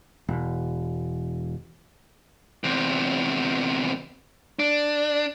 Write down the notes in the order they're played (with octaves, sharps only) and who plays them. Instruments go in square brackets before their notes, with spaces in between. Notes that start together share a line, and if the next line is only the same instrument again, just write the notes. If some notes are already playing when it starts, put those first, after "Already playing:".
[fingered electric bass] E1
[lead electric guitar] E2 C3
D4